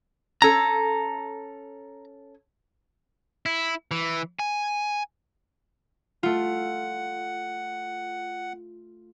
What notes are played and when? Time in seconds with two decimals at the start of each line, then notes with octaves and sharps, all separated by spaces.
0.42 C#4 A4 A#5
3.46 E4
3.91 E3
4.39 G#5
6.23 A3 F4 F#5